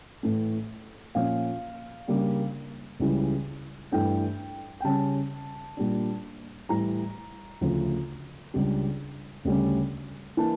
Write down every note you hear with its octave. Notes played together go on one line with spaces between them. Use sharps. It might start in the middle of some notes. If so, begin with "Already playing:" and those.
A2 E3 A3
A#2 F3 C#4 F5
C#3 G3 A#3 D4
C#2 C#3 E3 G3
G2 E3 A3 D4 G5
G5
C#3 G3 C#4 A5
A#2 G3 D4
A2 E3 G3 A#5
D2 C#3 F3
C#2 C#3 G3 D4
D2 C#3 G3 C#4
E3 A#3 D4 A5